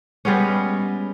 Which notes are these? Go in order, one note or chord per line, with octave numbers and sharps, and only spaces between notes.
G3 G#3 B3 C#4